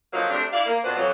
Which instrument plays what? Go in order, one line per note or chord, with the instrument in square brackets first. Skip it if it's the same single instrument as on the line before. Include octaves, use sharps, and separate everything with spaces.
[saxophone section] D3 F3 F#3 A#3 D#5 F5
C3 A3 D4
E4 D5 F5
A#3
F2 B2 D4 B4 C5 F#5
F2 F#3